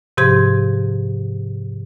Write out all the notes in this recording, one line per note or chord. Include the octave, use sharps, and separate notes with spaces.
G#2 C3 F3 G4 C6 G#6